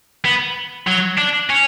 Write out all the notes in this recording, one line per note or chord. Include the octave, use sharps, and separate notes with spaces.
B3
F#3
D4
C#4